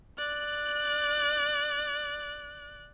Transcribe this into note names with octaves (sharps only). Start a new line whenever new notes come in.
D5 F#6